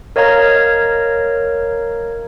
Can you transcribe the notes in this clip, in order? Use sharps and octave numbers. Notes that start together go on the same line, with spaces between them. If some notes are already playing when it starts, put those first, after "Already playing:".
A#4 C#5 D#5 F5 A#5 G#6